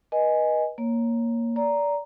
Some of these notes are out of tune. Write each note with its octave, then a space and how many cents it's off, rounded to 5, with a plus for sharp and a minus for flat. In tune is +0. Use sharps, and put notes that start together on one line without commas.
B4 -35 D#5 +0 G#5 +0
A#3 +0 C#5 +0
D5 -20 A#5 +0